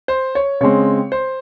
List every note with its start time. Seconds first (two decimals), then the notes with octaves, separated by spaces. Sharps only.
0.08 C5
0.35 C#5
0.61 C#3 G#3 C4 C#5
1.12 C5